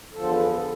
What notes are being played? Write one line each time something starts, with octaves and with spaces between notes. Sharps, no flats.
E2 D3 F3 A4
C5
B4
G#4
A4